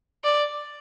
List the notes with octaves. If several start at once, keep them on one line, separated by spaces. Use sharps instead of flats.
D5